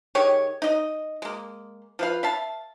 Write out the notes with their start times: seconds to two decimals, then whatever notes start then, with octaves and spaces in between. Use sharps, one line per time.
0.15 D#3 G4 G#4 C#5
0.62 D#4 D#5
1.22 G#3 A#3
1.99 F3 B4 F5
2.23 E5 F5 A5